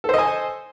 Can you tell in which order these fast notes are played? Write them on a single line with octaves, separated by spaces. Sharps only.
A4 C5 D#5 G#5